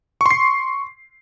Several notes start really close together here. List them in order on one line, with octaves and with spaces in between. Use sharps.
C#6 C6 C7